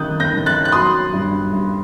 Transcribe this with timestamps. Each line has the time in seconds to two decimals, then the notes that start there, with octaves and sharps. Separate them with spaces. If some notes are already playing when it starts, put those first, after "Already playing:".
Already playing: D#3 G3 D#6 F#6 G6 A6
0.20 G6 A#6
0.33 D#3
0.46 F#6 A6
0.65 F#6
0.72 F#3 C6 D#6
1.14 G2
1.53 G2